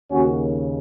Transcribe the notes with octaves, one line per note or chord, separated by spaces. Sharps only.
D#2 C#3 C#4 F#4